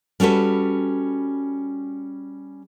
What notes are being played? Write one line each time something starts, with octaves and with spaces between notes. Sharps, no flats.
G3 C#4 F#4 A4 B4